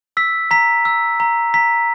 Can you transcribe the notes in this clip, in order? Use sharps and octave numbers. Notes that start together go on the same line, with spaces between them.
E6 B6
A#5 B6
E6
A#5
A#5 B6